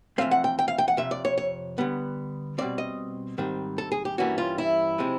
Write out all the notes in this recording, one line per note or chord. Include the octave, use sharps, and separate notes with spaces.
F2 C#3 E3 A3 C4 F5
F#5
G5
G5
F5
G5
F#5
F2 C3 E5
D5
C#5
C#5
D3 G3 B3
B2 G3 C4 D5
D#5
G#2 D#3 G3 C4
A4
G#4
G4
G2 E3 G3 A#3 C#4 F#4
F4
E4
C3 F3 G#3 C4